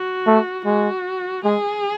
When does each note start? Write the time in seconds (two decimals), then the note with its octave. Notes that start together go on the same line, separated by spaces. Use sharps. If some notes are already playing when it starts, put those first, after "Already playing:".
Already playing: F#4
0.27 A3
0.65 G#3 F#4
1.44 G#3 G#4